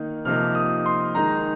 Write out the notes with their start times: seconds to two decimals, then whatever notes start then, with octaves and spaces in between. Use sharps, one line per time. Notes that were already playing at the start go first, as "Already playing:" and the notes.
Already playing: D#3 A#3 D#4
0.25 C3 F3 A#3 D#4 F6
0.55 D#6
0.86 C6
1.15 D#3 G#3 D#4 A#5